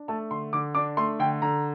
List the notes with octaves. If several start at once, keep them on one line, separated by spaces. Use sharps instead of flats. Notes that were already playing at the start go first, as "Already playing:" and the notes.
Already playing: D4
A3 A5
D3 C6
D3 D6
D4 D6
A3 C6
D3 G5
D3 A#5